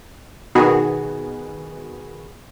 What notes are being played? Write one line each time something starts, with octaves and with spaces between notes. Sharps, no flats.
B2 D#3 B3 F#4 G#4